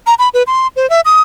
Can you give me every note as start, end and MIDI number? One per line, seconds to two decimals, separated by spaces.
0.07 0.14 82
0.19 0.29 83
0.34 0.43 71
0.47 0.68 84
0.76 0.89 72
0.90 1.01 76
1.05 1.22 87